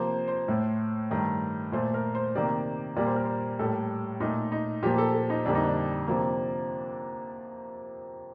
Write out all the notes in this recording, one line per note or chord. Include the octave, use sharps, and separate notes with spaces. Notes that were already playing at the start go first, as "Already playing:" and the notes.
Already playing: C3 F3 A#3 C5
C5
A2 A3
G2 D#3 A3
A#2 A3 C5
A#4
C5
C3 D#3 A#3 D5
A#2 G3 A#3 D5
C5
A#4
C5
A2 G3 A#3 A4
A#2 A3 D#4
D#4
A#2 F3 A#3 G4
A4
A4
D#4
F2 D3 G3 A#3 D4
D#4
D4
C3 F3 A#3